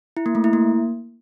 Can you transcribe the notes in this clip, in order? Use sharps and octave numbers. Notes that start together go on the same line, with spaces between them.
E4
A#3
A3
E4
A#3